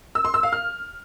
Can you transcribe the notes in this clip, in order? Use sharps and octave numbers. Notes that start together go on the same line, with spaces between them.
E6
C6
E6
F5
F6